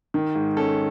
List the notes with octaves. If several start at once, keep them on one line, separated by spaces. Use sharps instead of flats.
D#3
G#2
C#4 A4